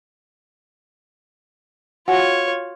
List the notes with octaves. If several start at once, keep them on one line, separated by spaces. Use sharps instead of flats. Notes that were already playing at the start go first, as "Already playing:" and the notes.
F4 F#4 C#5 F#5 G#5